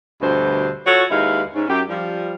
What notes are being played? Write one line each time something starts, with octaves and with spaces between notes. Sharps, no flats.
D2 G2 B2 A4 C5
F4 F#4 A4 C#5
D#2 G#3 D#4 E4 B4 F5
G#2 C#4
F#2 G4
F3 G3